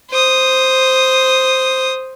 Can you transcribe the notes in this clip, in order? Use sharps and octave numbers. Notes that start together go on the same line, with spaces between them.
C5 D#6